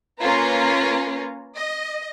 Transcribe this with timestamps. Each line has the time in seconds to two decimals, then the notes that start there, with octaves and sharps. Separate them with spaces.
0.20 A#3 C#4 F4 B4 A#5
1.57 D#5